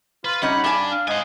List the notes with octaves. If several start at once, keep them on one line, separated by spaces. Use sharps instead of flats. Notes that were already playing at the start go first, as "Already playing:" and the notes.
F4 B4
G3 C#4 D#4 F#5 B5
G2 D4 G#5
F5
G#2 D#5 F5 G#5